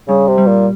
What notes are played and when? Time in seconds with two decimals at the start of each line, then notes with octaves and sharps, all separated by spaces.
0.08 G2 C#3
0.28 C3
0.38 G3
0.47 A#2